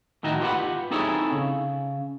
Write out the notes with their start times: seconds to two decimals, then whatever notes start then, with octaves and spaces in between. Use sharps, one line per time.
0.23 A2 D#3 D#4 E4 F#4 D#5
0.40 F4 G4 B4 E5 F#5 B5
0.91 C4 D#4 E4 G#4 A4 C#5
1.32 C#3